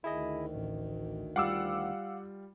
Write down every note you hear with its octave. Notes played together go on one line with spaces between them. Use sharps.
D2 D#3 E4 G#4 D#5
A1
G3 F4 F5 F#5 D6 E6